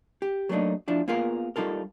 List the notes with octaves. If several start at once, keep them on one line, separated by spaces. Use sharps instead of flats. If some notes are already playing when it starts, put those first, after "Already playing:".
G4
F#3 A3 A#3 C4 D4 D#4
F3 D4 E4
A#3 B3 F4 G#4 A#4 F5
G3 D#4 F4 A4 A#4